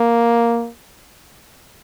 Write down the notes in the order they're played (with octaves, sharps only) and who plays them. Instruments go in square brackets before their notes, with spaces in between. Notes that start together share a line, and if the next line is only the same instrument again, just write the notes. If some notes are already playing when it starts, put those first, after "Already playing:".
Already playing: [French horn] A#3